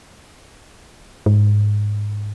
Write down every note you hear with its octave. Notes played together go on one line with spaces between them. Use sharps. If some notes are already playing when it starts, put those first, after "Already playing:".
G#2